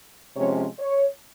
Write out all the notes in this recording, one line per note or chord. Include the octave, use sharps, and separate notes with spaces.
C3 F3 G#3 C#4 C#5
C#5